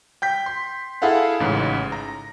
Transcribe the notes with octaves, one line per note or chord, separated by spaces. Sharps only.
G5 G6 B6
C6
E4 G#4 A4 F5 F#5
A1 G#2 C#3
A#5